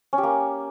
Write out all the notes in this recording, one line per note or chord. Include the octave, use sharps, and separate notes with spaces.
C#4
G4
A#3